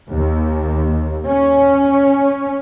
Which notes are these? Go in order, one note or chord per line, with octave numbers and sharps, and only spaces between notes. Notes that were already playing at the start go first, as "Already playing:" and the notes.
D#2
C#4